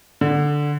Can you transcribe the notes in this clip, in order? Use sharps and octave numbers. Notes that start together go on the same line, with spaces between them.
D3